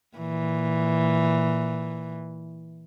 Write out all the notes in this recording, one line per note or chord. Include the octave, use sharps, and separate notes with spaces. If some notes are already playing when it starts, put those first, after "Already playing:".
A#2 E3